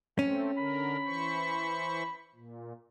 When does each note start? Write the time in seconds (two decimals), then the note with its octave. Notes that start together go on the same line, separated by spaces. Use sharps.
0.19 A3 C4 C#4
0.57 D3 A#4 B5
1.06 E3 C5 C#6
2.35 A#2